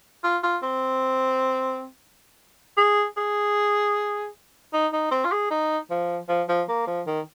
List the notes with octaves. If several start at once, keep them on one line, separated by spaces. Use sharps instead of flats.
F4
F4
C4
G#4
G#4
D#4
D#4
C4
F4
G#4
D#4
F3
F3
F3
A#3
F3
D#3